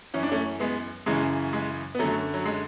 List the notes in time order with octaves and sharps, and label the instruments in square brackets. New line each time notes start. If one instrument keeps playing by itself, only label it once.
[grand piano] F#2 E3 C#4
D4
A3 C#4
G#3 B3
F#2 C#3 E3 G#3
G#3
B3
F#2 D3 F#3 A3
F#3
G#3